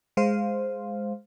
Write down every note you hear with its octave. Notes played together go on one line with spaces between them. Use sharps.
G#3 C5 F5